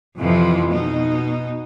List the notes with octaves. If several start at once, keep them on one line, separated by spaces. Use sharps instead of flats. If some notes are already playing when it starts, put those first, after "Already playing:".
F2 C3 E3 F3
B2 D#4